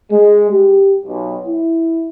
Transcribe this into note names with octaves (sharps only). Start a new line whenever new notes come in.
G#3
G4
B1
E4